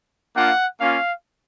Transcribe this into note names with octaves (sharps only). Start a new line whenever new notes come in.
A#3 D4 F4 F#5
A#3 C#4 F4 F5